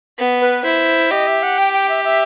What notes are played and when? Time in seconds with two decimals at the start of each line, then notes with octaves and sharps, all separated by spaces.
0.19 B3
0.41 B4
0.64 E4 C5
1.11 G4 D#5
1.27 E5
1.43 F#5
1.58 G5
1.73 G5
1.89 E5
2.04 E5